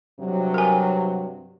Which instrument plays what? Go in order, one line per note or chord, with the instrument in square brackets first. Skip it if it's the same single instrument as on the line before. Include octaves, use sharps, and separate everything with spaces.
[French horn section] G2 C3 F#3
[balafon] A#4 G#5